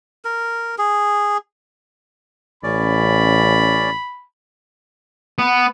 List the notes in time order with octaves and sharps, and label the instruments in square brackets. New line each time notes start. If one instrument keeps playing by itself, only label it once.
[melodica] A#4
G#4
[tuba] A1 [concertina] C#4 D5 [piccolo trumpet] B5
[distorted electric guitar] B3